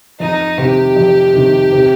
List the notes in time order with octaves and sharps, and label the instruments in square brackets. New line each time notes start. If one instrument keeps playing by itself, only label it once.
[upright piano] F2 [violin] D#4
[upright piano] C3 D#3 [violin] G4
[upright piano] F2
C3 D#3
C3